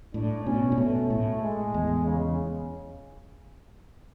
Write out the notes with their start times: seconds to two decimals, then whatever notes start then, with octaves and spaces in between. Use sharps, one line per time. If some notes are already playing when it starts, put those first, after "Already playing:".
0.14 A2 D4
0.45 B2 C#4
0.72 A2
0.78 B2 A3
1.10 A2
1.42 G#3
1.74 E2
2.06 C#3